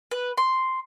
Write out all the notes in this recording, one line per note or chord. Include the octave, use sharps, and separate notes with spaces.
B4
C6